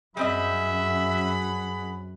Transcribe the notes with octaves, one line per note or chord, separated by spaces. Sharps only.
F#2 G3 C4 G#4 D#5 E5 F#5 B5